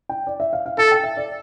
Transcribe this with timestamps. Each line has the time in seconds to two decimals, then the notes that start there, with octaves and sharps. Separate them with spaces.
0.09 G5
0.27 D5
0.40 E5
0.53 F5
0.66 F5
0.78 A4 A5
0.92 G5
1.03 E5
1.17 D5